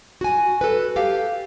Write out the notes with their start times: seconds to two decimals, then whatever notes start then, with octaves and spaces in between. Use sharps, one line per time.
0.21 F#4 G#5
0.61 A4 B4
0.96 G4 A4 F5